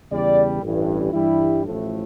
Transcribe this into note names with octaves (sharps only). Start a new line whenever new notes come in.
E2 C#3 G3 D5
A1 G2 E3
G2 E3 G3 E4
A1 A2 F3 A3